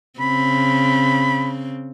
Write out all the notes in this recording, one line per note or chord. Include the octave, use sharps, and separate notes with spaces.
C#3 C4 B5